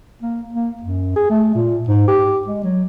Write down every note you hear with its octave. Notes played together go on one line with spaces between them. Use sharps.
A#3
A#3
F#2
G#4
A3
A#2
G#2
G4
G#3
F#3